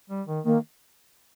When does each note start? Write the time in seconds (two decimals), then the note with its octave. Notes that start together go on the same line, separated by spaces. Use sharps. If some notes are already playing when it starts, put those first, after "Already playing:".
0.10 G3
0.27 D#3
0.45 D#3 A#3